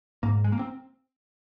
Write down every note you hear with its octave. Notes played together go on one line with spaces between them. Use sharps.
G#2 A#3
G#3
A#3
C4